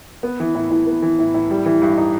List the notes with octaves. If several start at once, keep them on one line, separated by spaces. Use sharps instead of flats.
B3
E3
A2
A2
B3
E3
A2
A2
G3
E3
G2
D#4